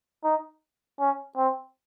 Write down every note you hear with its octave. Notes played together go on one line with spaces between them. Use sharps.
D#4
C#4
C4